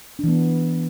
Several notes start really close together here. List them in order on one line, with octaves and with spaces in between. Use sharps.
D4 E3 B3